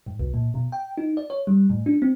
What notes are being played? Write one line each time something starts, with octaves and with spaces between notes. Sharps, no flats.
G#2
C2
A#2
B2
G5
D#4
D5
C#5
G3
A2
D4
C4